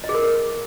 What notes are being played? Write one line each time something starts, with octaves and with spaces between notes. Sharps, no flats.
D#5
G#4
A#4